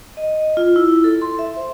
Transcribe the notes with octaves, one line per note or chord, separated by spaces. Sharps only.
D#5
F4
E4
A4
C6
E5
C5